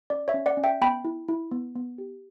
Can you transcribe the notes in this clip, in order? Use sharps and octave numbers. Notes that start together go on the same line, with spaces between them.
C#4 D5
C#5 E5
C#4
D5 F#5
C#4
E5 G5
B3 G5 B5
E4
E4
B3
B3
G4